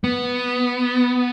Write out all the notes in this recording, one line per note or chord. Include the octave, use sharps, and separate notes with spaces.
B3